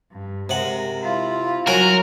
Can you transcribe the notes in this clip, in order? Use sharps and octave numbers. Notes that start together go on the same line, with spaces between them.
G2
C3 G#3 A#4 F#5
E4 F4
F#3 F#4 A#4 G#5